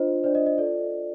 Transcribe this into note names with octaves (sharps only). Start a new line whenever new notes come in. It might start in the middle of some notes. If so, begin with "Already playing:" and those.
Already playing: D4 F4 C5 D#5
D4 F4 C5 D5
D#5
D#5
F4 A4 D5